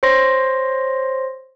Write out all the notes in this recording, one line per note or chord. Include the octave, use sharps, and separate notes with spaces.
C5 C#5 C6 A#6